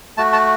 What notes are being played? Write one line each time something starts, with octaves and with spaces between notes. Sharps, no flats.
A3 F#4 A5
A5